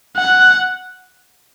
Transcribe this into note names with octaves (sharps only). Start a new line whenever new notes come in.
F#5